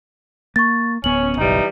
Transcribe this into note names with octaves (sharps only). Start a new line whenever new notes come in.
A#3 C#6 A6
D1 B3 C#4 F#7
F#1 B1 E3 G3 D#4